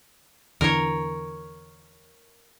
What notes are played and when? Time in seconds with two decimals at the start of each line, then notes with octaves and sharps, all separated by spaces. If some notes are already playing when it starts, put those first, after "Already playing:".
0.61 E2 D3 E3 A#4 C#5